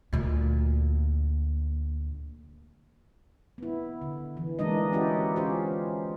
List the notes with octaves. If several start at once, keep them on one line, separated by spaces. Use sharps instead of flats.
D2 A#2
B3 E4
D3
E3
E3 G#3 A#3 D4 D#4 D#5
C#4 D#4 E4 F#4 G4 D5
C#4 F4 G4 G#4 C5